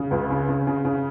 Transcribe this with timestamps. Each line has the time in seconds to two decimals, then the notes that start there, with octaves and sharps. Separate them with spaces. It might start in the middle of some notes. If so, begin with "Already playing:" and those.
Already playing: C#3
0.11 C#2
0.30 C#3
0.48 C#3
0.67 C#3
0.85 C#3